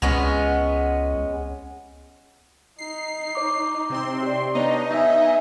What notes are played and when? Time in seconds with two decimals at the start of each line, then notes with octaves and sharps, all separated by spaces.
0.02 C#2 G#3 B3 C#4
2.78 D#4 C7
3.35 C#5 D6
3.90 C3 C4 C6
4.23 G4 D5
4.55 B3 D4 D#4 C#5 D#5
4.90 B3 E5 G#5